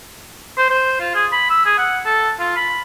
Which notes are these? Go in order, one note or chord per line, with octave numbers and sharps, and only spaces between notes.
C5
C5
F4
G#4
B5
E6
G#4
F#5
A4
F4
B5